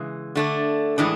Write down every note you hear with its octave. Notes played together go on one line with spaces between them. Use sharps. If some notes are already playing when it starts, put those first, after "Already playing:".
Already playing: C#3 E3 G#3
D3 A3 D4
A2 E3 G#3 D4